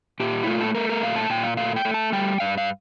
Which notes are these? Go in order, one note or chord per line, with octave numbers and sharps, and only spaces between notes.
A#2 G4
E4
A3 F4
A4
A3 A#4
A#4
A#2 F5
A5
A#2 G5
F5
A3 F5
G5
A3
A5
G3 G5
G2 F5
F5